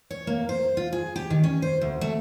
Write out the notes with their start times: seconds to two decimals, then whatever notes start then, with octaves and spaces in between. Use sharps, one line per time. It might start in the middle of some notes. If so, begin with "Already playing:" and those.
0.10 C#5
0.27 A#3
0.49 C5
0.77 F4
0.93 G#4
1.16 G4
1.30 D#3
1.44 C#4
1.62 C5
1.81 D2
2.01 A3